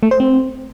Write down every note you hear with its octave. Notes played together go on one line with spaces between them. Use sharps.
A3
C5
C4